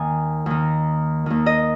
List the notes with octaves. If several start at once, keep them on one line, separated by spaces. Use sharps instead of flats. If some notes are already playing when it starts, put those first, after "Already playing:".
Already playing: D#2 D#3 G#5
D#2 D#3
D#2 D#3
D#5